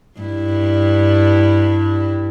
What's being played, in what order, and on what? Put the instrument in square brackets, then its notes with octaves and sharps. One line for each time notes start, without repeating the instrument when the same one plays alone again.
[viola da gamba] G2 E4